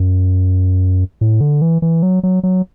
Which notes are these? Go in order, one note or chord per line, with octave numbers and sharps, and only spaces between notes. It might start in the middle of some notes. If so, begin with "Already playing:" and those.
Already playing: F#2
A2
D3
E3
E3
F#3
F#3
F#3